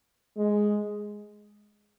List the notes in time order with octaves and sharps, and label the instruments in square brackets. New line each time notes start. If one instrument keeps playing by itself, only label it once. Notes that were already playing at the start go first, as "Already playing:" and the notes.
[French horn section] G#3